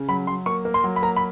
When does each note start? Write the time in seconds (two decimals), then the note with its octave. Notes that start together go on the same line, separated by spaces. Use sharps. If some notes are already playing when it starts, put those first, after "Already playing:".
Already playing: C#3
0.09 F#3 B5
0.27 F#3 C6
0.46 A#3 C#6
0.65 A#3
0.74 C6
0.84 F#3
0.96 B5
1.02 A#3 A#5
1.16 B5